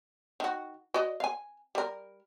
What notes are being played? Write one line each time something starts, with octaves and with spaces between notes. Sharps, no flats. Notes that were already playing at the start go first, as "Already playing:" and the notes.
D#3 F#4
F#4 D5 D#5
F5 G#5
G3 A#4